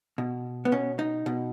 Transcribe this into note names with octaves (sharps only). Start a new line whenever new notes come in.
B2
B3
B2 C#4
D#4
B2